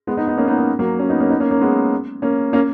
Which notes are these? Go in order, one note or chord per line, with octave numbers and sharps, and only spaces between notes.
G#3 B3
B3 D#4
B3 D#4
A#3 C#4
B3 D#4
A#3 C#4
F#3 A#3
A#3 C#4
B3 D#4
A#3 C#4
B3 D#4
A#3 C#4
A#3 C#4
G#3 B3
A#3 C#4
A#3 C#4